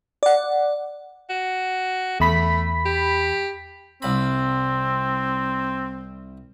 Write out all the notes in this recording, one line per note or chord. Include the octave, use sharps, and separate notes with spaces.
D5 F#5
F#4
E2 A3 B5 B6
G4
C2 C4 B5